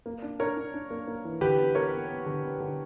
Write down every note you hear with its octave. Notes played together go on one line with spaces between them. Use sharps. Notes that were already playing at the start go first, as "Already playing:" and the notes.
A#3
D4
D4 A#4 C#5
D4
D4
A#3
A#3
E3
D3 G4 B4
B3
B3 A#4 C#5
B3
B3
D3
B3
D3